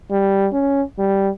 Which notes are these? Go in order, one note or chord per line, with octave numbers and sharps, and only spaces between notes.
G3
C#4
G3